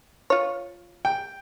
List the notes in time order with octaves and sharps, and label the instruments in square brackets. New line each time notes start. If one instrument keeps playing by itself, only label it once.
[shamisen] F4 C#5
[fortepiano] G5